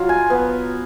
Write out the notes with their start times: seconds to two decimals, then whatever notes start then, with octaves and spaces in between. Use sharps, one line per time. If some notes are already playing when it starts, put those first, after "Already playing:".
Already playing: F#3 F4
0.09 G#5
0.30 B3